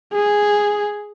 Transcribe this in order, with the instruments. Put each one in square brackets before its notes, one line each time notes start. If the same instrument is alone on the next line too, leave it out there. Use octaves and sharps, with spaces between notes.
[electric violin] G#4